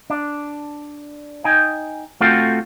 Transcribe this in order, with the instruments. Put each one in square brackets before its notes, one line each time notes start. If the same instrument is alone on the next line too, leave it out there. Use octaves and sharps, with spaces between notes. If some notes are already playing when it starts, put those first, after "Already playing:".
[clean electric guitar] D4
D#4 D#5 G5 G#5
A3 C4 F4 F#4 A4 G5